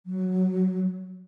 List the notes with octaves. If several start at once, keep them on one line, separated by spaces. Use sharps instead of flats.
F#3